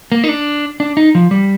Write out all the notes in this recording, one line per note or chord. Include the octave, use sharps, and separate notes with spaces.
A#3
D#4
D4
D4
D#4
F3
G3